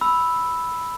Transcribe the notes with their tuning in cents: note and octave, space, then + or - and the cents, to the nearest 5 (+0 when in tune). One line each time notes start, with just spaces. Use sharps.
B5 +0 E6 +0